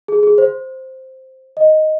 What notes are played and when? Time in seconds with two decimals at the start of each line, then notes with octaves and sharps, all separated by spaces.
0.08 G#4
0.23 G#4
0.38 C5
1.57 D#5